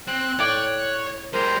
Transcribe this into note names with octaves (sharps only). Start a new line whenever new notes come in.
C4 F#6
A2 C#5 D5 G5
G#3 G4 A#4 C5 A#5